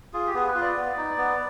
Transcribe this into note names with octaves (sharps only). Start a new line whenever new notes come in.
F4 G#4
G4
B3 G#4
B4
F4
D5
B3
D#4
B3